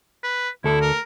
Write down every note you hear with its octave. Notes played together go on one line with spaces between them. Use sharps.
B4
D2 E4 A4
A#4